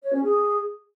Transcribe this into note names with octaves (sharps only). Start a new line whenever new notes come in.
C#5
C#4
G#4